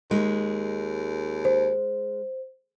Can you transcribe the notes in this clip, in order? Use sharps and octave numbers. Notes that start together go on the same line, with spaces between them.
D#2 G#3
C5